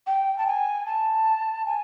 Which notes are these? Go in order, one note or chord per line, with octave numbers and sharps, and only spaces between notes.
G5
A5
G#5
A5
G#5